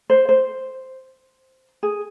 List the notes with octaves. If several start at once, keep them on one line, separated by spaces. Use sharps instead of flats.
C5
C5
G#4